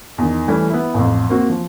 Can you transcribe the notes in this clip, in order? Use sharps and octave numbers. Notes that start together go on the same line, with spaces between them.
E2 D#3
E3 G3 A3 C#4
B3 E4
A1 F2
A#3 C4 F#4
F3